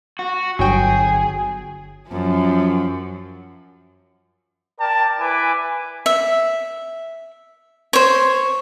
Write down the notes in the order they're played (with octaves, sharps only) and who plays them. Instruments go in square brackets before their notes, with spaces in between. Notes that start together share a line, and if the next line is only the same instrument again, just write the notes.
[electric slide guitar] F#4
[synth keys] G1 F#3 G5 [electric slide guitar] G#4
[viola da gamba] F#2 F3
[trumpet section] A#4 D5 G5 A5
E4 B4 G#5 D6
[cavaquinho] E5
C5 C#5